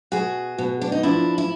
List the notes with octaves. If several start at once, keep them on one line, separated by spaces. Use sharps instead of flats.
B2 F#4 G#4
B2
D4
D#4
F3 D4 E4
E4